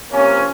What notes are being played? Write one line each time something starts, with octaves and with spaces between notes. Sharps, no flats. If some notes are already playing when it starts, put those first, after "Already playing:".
C3 F3 A#3 C#4